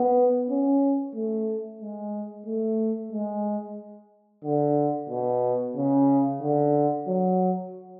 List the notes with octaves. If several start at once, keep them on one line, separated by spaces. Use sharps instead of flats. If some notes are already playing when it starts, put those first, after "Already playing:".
Already playing: B3
C#4
A3
G#3
A3
G#3
D3
B2
C#3
D3
F#3